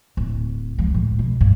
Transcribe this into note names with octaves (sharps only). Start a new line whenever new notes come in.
D1
C#2 F3
A2
B2
G2